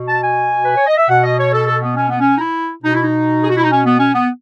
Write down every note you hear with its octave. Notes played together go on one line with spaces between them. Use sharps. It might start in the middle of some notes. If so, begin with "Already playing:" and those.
Already playing: B2
A5
G#5
B4
C#5
D#5
E5
B2 F#5
D#5
C#5
A4
A4
B3
C#4
B3
C#4
D#4
E4
B2 D#4
E4
D#4
G#4
F#4
E4
D#4
C#4
B3
C#4
B3